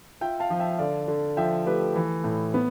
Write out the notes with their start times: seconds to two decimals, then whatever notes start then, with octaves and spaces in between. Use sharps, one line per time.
0.21 F4 E5 G5
0.40 F5 A5
0.50 F3
0.59 E5 G5
0.78 D3 D5 F5
1.08 D3
1.37 F3 E5 G5
1.66 A3 G4 B4
1.96 E3
2.24 A2
2.54 B3